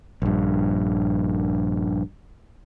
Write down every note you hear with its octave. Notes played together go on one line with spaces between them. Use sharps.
A#1 G2